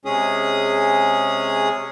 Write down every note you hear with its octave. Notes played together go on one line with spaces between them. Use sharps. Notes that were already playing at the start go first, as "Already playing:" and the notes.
C3 G#3 C#4 G#4 D#6